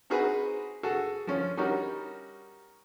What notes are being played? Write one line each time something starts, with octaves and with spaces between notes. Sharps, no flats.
C4 D#4 F#4 G#4 B4
F#4 G#4 A4
F3 C#4
G3 C#4 D#4 F#4 A#4